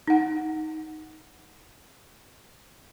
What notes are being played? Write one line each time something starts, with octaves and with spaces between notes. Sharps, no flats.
D#4 F#5